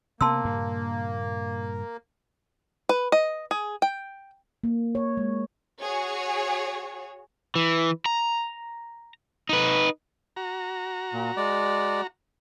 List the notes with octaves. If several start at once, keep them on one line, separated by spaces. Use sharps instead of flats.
C3 A#3 B3 A5 C6 E6
G2 A#2 C#3
B4
D#5
G#4
G5
A#3
C#5
G#3
F#4 G#4 C#5
E3
A#5
D#4 B4
F#4 A#5
A#2
G#3 D5